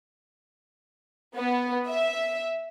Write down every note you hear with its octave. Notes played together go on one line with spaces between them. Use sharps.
B3
E5